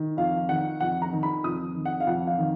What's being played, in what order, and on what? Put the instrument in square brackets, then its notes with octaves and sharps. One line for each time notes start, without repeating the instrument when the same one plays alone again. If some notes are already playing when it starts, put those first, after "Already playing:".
Already playing: [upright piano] D#3
F2 F5
D#3 F#5
F2 F#5
A#5
D#3
B5
F2 D#6
D#3
F#5
F5
F2 F#5
F5
D#3